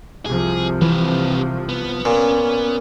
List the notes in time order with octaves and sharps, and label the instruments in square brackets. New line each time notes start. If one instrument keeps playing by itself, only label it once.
[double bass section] C2 C3 F3 [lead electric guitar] G#4
[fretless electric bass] E3 [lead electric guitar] C4 B4
[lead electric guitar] B3
[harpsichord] A#2 [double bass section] C#4